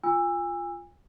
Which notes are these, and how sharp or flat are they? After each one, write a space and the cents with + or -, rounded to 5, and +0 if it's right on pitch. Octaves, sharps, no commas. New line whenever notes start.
F4 +0 G#5 -30 E6 +10